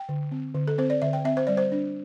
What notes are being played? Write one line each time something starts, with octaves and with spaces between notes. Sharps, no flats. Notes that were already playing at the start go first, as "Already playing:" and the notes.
Already playing: G5
D3
C4
D3
A4
C4 C5
D5
D3 E5
G5
C4 E5
C5
G3 D5
C5
D4